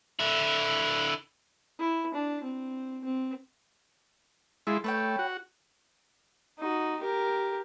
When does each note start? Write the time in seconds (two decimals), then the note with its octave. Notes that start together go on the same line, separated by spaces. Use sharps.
0.20 D3 E4
1.79 E4
2.14 D4
2.44 C4
3.05 C4
4.67 G#3 E4 F4
4.84 A3 B4 C#5 G5
5.19 F#4
6.59 D#4 F#4
7.00 G4 A#4